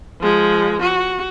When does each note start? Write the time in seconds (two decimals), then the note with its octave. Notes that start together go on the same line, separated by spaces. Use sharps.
0.20 F3 G#3
0.82 F#4